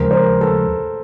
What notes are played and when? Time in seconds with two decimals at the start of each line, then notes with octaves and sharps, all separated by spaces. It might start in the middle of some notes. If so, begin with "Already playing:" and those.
Already playing: D#2 C#3 F3 G#3 A#4 C5
0.11 A#4 C5
0.41 A4 B4